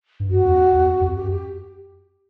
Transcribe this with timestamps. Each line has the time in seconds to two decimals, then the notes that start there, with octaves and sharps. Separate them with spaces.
0.20 G2
0.30 F#2 F#4
0.45 E2
0.73 E2
0.87 F2
1.01 F2
1.16 F#2 G4
1.30 G4